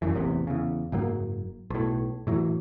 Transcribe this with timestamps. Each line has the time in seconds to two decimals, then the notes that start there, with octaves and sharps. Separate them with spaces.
0.02 F1 F#2 E3
0.14 A1 E2 C3
0.47 E2 C#3
0.92 F#1 G#2 F#3 A#3
1.70 B1 A2
2.27 A2 E3 F#3